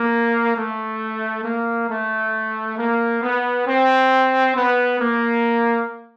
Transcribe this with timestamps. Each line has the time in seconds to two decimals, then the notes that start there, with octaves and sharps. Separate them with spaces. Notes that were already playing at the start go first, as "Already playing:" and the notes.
Already playing: A#3
0.56 A3
1.44 A#3
1.90 A3
2.78 A#3
3.22 B3
3.67 C4
4.56 B3
5.00 A#3